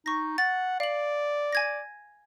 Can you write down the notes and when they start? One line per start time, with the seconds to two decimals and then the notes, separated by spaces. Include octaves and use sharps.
0.06 D#4 C#6 A#6
0.38 F#5 A6
0.80 D5 F5 F#7
1.53 G#5 G#6 A#6